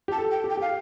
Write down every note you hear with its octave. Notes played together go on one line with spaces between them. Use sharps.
G4 A5
A4
G5
G4
G5
G4 F5